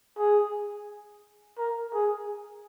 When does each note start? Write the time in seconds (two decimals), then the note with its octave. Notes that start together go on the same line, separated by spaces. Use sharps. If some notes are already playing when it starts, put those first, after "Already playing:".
0.18 G#4
1.58 A#4
1.94 G#4